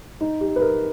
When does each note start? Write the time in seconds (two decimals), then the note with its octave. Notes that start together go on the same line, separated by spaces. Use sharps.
0.21 D#4
0.41 G4
0.56 B4
0.61 A#4